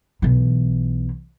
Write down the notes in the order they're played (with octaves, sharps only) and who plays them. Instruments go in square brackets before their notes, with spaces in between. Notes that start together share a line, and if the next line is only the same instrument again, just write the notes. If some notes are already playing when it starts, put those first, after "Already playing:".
[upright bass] B1 E3